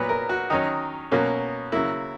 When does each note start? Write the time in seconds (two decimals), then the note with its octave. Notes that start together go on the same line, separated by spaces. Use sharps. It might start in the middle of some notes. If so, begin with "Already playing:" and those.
Already playing: A#2 F#3 B3 B4
0.09 A#4
0.29 F#4
0.50 D#3 F#3 C#4 D#4
1.11 B2 F#3 A#3 C#4
1.72 C#3 F#3 A#3 E4